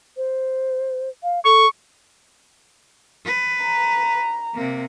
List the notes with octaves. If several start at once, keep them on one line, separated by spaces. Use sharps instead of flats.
C5
F5
A4 C#6
B4
A#5
C3 A#3